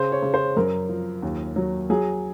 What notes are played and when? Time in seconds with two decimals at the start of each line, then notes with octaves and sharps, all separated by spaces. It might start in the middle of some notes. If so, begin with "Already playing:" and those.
Already playing: C#3 C5
0.12 C#5
0.22 C#3
0.34 C5
0.57 F#2 A#4
0.89 F3
1.22 D#2
1.56 F#3
1.90 F#3 G#4